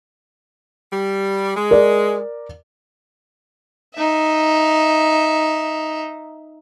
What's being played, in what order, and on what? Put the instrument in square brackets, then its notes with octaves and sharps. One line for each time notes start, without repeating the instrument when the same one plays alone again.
[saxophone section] G3
G#3
[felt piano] A#4 D5
[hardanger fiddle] D#4 E5